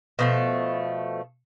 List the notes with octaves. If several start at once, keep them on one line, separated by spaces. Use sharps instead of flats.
B2 F3 A3